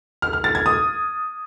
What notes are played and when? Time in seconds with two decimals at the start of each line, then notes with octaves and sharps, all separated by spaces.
0.22 F6
0.33 F6
0.44 A6
0.55 G#6
0.66 D#6